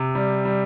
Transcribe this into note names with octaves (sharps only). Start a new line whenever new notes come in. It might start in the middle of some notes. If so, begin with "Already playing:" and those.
Already playing: C3
G3
G3